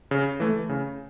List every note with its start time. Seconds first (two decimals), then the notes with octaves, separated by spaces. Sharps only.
0.11 C#3
0.40 E3 A3
0.69 C#3